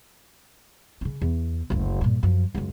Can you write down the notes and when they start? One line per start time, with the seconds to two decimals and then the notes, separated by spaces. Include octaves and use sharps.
1.01 C#3 C#4
1.21 E2
1.70 F#1 D2
2.01 G2 A#2
2.23 F#2 F3
2.55 C#2 F#2